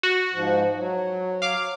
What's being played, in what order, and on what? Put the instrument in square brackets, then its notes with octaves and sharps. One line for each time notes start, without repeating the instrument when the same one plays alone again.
[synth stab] F#4
[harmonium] G#2 F3
F#3
[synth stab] F5 D6